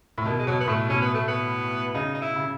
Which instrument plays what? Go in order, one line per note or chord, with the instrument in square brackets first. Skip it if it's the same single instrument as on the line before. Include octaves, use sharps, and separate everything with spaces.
[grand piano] A2
[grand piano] B2 [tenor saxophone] D#3
[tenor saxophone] G#3
[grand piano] B2 [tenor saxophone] F#3
[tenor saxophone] B3
[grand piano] A2 [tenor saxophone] A3
[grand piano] B2 [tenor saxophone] C#4
[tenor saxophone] B3
A3
B3
[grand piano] C#3 [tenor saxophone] D#4
[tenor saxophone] D#4
E4
[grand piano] C#3